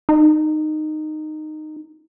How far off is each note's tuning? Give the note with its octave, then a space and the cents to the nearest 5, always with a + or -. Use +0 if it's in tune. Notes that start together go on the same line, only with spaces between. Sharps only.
D#4 -15